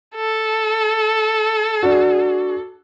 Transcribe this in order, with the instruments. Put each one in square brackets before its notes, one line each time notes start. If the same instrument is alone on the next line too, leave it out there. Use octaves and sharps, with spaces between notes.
[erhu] A4
[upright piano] D4 F#4